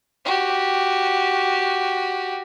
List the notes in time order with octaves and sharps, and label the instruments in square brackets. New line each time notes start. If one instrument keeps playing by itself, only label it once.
[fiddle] F#4 G4